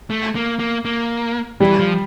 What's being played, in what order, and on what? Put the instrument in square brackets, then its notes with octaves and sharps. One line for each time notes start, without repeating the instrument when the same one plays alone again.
[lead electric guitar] A3
A#3
A#3
A#3
[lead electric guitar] E3 [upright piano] G3
[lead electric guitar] F3